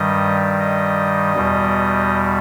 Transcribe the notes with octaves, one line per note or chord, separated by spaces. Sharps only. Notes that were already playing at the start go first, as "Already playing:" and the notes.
Already playing: G2 D#3 G3 D#5
D#5
E2 B2 G3